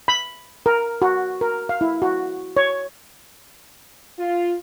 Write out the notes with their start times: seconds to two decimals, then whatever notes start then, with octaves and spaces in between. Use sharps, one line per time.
0.08 B5
0.66 A#4
1.02 F#4
1.41 A#4
1.69 F5
1.81 E4
2.02 F#4
2.57 C#5
4.19 F4